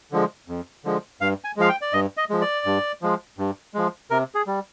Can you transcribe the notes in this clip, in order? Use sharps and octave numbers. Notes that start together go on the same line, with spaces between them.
D3 F3 G#3
F2
D3 F3 G#3
G2 F5
G#5
F3 G#3 F5
G5
D5
G2 D#5
D#5
F3 G#3
D5
G2
F3 G#3
G2
F3 G#3
C3 A#4
G#4
G3